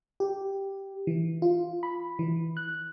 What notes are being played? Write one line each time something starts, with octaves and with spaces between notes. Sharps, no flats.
G4
E3
F4
B5
E3
F#6